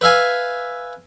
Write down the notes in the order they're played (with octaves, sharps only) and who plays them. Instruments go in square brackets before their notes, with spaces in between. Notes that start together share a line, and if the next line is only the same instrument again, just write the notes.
[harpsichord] B4 E5 F5 G#5